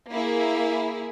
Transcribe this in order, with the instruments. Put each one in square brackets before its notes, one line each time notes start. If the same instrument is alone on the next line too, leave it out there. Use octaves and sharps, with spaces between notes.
[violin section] A#3 E4 G#4